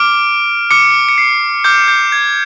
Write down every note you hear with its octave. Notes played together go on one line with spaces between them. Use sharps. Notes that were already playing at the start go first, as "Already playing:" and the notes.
Already playing: D6 F6 D7
D6 F6 C#7
C#7
C7
D6 F6 G6
G6
G#6